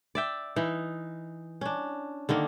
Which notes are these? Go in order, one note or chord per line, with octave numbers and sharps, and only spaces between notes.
D5 E5 G5
E3 D#4
C#4 D4
D3 D#3 A#3 D#5